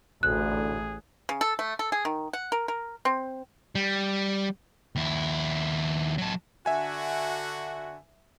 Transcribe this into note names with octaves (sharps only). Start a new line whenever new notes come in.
A1 D2 A2 G#4 F#6
C#3
A4
A3
A4
G#4
D#3
F#5
A#4
A#4
C4
G3
D#2 E4
F#3 A4
D3 F#4 E5 G#5